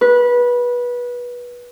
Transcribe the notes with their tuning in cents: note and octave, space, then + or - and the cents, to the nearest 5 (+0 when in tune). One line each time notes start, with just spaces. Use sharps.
B4 -20